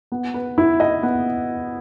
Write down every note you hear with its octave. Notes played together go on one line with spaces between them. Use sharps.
B3
B4
E4
D#5
B3